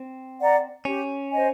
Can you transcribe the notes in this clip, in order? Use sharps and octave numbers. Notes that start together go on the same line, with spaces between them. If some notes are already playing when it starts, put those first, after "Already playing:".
Already playing: C4
D5 F#5 A#5
C#4 G4
C5 D#5 G#5